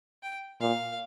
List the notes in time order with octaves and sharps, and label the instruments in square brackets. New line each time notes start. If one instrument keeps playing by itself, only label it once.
[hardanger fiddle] G5
[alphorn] A#2 [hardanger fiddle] F5